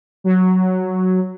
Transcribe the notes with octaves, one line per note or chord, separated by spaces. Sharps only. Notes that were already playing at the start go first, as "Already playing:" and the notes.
F#3